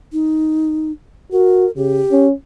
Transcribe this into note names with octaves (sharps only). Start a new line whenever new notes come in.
D#4
F#4 A#4
C#3 G4
C#4